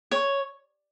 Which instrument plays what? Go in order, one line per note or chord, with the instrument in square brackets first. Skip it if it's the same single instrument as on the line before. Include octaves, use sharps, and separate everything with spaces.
[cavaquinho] C#5